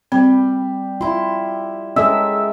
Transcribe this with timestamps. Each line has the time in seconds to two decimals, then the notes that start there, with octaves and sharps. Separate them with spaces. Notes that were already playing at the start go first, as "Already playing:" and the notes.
0.12 G3 C4
1.01 E4 F4 C6
1.96 G#3 C#4 A4 A#4 D#5 E5